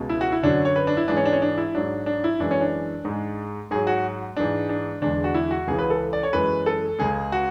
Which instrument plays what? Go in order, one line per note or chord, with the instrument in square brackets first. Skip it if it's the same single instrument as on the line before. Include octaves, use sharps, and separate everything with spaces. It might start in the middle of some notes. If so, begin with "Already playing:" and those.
Already playing: [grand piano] C#2 B2 G#3
E4
F#4
E4
F#2 D3 F#3 D4
C#5
B4
D4
E4
G#2 E3 G#3 D4
C#4
D4
C#4
D4
E4
G#2 F#3 D4
D4
E4
F#2 E3 G#3 D4
C#4
D4
G#2 G#3
G#2 F#3 G#4
F#4
G#2 E3 G#3 D4
D4
E2 D3 G#3 D4
F#4
E4
F#4
C#2 C#3 E3 G#4
B4
A4
D5
C#5
F#2 E3 G#3 B4
A4
C#2 C#3 G#3 G#4
F#4